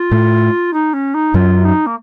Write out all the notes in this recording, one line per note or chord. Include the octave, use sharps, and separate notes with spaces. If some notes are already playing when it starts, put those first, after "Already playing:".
Already playing: F4
A2 A3
D#4
C#4
D#4
F#2 F#3 F4
D#4
A#3